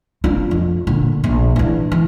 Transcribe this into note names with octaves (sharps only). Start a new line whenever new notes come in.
D4 F4
F2
A#2 D3
A#1
E3 D4
E3